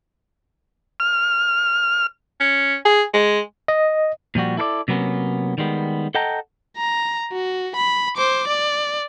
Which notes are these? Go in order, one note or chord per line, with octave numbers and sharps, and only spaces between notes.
F6
C#4
G#4
G#3
D#5
A#2 F3 G3 F#4
E4 A4 A#4 D5
C3 F#3 A#3 B3 C#4
D#3 G3 G#3 B3
A4 D#5 F#5 G5 A5 A#5
A#5
F#4
B5
C5 D6
D5